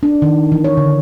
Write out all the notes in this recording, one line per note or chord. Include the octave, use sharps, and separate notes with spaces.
D4
D#3
E3
C#5
D3